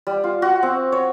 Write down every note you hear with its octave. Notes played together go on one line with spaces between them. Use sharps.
G3
F4
F#4
C4
C#5